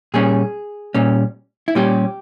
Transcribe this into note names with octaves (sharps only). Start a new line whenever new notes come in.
A#2 G3 C#4 G#4
A#2 G3 C#4
E4
A#2 G3 C#4 G4